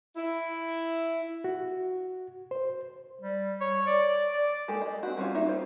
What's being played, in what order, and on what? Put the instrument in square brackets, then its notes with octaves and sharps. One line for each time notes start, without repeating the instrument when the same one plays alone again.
[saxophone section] E4
[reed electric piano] F#4
C5
[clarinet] G3
C#5
D5
D5
[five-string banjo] G#3 A#3 G4 A4
D#5
C4 F#4
G3 C4 C#4 F4
A#3 D#4 A#4 E5
F4 C5